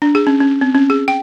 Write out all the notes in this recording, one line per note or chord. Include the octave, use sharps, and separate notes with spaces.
D4
G#4
C#4
C#4
C4
C#4
G#4
G5